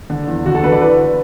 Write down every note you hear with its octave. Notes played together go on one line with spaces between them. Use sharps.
D3
E2
D3 F#4
A4
D3 B4
D5
E3 B4